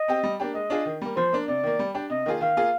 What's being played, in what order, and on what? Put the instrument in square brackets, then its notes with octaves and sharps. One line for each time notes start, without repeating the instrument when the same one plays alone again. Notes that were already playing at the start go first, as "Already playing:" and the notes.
Already playing: [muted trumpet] D#5
[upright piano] C4 G4
G3
A#3 D4 G4
[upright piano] G#3 [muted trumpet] D#5
[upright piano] D4 F4 G#4
D#3
G3 A#3
[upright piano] F3 [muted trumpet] C5
[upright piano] A#3 D4
[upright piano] C3 [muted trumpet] D5
[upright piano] D#3 A#3
G3
D4 G4
[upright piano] C3 [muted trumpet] D#5
[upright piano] D#3 A#3 F4 G#4
[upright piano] D#3 [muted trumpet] F5
[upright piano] A#3 F4 G#4